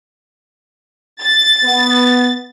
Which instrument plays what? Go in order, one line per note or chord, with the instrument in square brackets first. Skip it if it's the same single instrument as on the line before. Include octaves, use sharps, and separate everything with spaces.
[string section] A6
[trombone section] B3